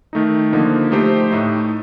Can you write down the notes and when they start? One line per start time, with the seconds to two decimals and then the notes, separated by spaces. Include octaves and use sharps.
0.13 D#3 A3 D#4
0.52 D3 F3 A#3 D#4
0.92 A3 D#4 G4 C5
1.31 A2 A3 D#4